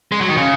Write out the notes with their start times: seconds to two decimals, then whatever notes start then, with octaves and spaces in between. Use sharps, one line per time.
0.12 G#3
0.21 F#3
0.28 D#3
0.37 C#3